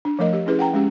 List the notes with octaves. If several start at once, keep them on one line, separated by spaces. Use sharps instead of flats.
D4
F3 A3 A#4 D#5
G4
C#4 E4 G#4 B4
F#5 G5 A#5
G#3 C#4 G4